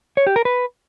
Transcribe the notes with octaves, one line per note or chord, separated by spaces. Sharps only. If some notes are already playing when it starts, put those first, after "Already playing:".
C#5
G4
A#4
B4